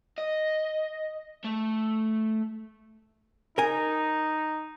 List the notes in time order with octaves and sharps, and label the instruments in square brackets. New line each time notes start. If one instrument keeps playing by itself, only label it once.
[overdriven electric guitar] D#5
A3
[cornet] D#4 [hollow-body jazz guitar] A#4 G#5